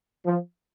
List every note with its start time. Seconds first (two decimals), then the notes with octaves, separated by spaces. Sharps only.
0.26 F3